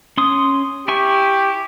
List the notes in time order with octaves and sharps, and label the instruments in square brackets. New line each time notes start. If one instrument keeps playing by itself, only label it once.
[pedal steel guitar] C#4 C6 D#6
[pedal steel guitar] E4 G#5 C#6 [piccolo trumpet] G4